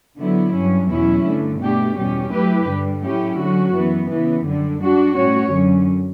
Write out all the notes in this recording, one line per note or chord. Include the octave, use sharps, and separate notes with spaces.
D3 F#3 B3 E4
G2 F#3 C#4
E2 B2 F#3 C#4 E4
G2 D3 A3
B2 A3 D4 G4
E2 B2 G3 C#4 G4
F#3 A3 E4 G4 B4
G2 D3 G3
A2 F#3 C#4 E4 G4
D3 F#3 C#4 F#4
F#2 E3 B3
C#3 E3 B3
F#2 D3 G3
G3 D4 F#4
A2 G3 C#4 F#4 C#5
F#2 D3 F#3 C#4